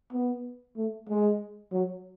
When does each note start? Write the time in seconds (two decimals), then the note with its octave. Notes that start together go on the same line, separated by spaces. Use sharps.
0.13 B3
0.76 A3
1.09 G#3
1.72 F#3